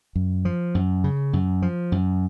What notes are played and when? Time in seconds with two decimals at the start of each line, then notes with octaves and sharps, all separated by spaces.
0.16 F#2
0.45 F3
0.75 F#2
1.04 C#3
1.33 F#2
1.62 F3
1.92 F#2